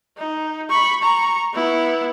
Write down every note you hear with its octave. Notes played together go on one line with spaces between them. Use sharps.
D#4
B5 C#6
A#5 C#6
B3 E4